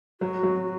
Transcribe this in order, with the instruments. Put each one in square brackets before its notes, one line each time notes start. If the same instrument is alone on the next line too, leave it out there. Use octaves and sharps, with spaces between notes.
[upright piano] F#3 [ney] F#4
[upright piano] F#3